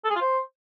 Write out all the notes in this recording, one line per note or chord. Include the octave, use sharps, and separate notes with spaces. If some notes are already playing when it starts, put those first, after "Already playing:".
A4
G#4
F4
C5